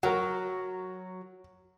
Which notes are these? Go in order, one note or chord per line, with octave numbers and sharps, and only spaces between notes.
F#3 F#4 A#4